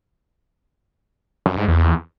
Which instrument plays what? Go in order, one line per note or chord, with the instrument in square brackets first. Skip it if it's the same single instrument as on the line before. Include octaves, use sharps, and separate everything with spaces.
[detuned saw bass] F#2
G#2
E2